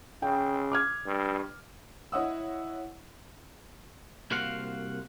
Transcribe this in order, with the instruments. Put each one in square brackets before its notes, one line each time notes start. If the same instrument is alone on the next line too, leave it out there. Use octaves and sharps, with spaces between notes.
[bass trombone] C#3 [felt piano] G5
[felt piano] D6 F6 G#6
[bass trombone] G2
[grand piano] E4 C#5 D#5 F#5 D#6 E6
[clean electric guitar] C2 A#3 F#4 C5 F5 F#5